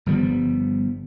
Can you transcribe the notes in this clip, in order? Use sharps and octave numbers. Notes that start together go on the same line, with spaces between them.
G1 F3 G3 B3